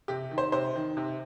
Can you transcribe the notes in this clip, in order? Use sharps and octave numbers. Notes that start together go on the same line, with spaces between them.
C3 G4
D#3
C5
C3 C5
D#3
C3